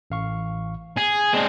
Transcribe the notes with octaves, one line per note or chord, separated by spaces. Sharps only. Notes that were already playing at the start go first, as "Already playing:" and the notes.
A1 F5 C#6
G#4 G#5
G#3 C4 D4